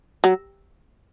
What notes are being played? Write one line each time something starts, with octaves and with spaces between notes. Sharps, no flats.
F#3